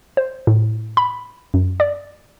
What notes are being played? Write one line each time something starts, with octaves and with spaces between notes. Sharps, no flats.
C5
A2
B5
F#2
D5